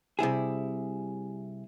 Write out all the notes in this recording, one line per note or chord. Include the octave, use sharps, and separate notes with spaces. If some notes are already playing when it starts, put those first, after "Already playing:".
C3 G3 E4 G#4